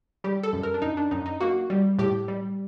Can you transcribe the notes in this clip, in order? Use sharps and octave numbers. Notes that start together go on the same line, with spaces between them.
G3 G4
A4
F#2
A#4
D4
F#2 D#4
D4
F#2 D#4
D#4
A#3 F#4
G3
A2 G4
G3